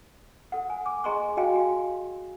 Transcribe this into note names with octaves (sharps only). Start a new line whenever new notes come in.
A4 F#5
G#5
D6
G#4 D#5 G#5 A#5 C6 C#6
F#4 D#5 F5 G5 G#5
G4 F5